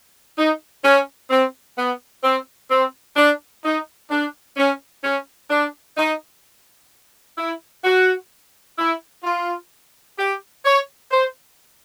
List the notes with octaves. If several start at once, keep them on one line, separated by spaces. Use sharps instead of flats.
D#4
C#4
C4
B3
C4
C4
D4
D#4
D4
C#4
C#4
D4
D#4
E4
F#4
E4
F4
G4
C#5
C5